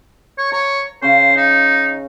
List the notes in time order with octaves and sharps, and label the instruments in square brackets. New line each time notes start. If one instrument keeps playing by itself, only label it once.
[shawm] C#5
[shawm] C#5 [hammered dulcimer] A#5
[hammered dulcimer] C#3 C#4 [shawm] C5
[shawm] D#4